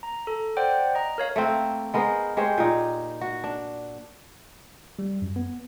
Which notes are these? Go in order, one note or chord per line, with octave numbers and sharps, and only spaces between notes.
A#5
A4
C5 D5 F#5 G5
D#5 A#5
A#4 C#5 F5
A3 A#3 C4
G#3 B3 A#4 C5
G#3 G4 C5 C#5
A#2 D#4
F#4
D4
G3
F#2
B3